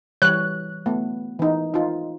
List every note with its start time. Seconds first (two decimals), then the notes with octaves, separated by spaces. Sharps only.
0.22 E3 G3 C#5 F#6
0.86 A3 B3
1.39 E3 D#4
1.74 D#4 F4